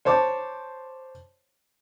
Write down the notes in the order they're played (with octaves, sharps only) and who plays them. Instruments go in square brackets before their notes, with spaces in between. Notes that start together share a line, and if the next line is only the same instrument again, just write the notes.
[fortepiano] C5 C#5 A5 D6